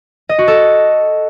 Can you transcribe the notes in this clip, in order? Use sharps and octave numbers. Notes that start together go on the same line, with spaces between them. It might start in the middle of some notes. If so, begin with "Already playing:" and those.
D#5
F#4
A4